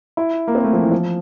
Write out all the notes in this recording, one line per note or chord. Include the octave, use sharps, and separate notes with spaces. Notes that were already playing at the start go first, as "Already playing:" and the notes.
E4
A#3
C4
A3
F3
E3
F3